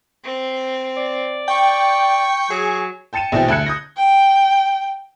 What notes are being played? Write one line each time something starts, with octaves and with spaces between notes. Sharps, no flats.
C4
D5
G5 C#6
F#3 G#4
G5 A5 A6 C#7 D#7 E7
A#1 B2 E3 C4 G5
D2 A5 F#6 G#6 C#7
D#6 G6 A#6
G5